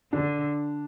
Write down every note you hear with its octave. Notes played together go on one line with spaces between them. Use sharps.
D3 D4